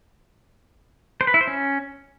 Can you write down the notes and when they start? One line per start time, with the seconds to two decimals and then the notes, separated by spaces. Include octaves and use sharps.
1.21 C5
1.27 B4
1.34 E4
1.41 C5
1.47 C#4